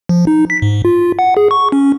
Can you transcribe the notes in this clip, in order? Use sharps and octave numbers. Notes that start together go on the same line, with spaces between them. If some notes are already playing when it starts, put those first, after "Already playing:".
F3
D#4
B6
G#2
F4
F#5
G#4
C#6
C#4